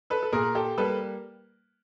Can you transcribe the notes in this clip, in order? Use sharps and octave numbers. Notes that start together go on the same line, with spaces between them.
A4 B4
A4
A#2 G#4 A#4
G4 A4
G3 A#3 A4 B4